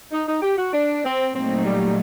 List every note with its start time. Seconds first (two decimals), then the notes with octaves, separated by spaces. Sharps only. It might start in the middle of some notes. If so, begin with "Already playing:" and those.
0.12 D#4
0.27 D#4
0.42 G4
0.57 F#4
0.73 D4
1.05 C4
1.34 A#2 F#3 A3 C4 D#4
1.65 G3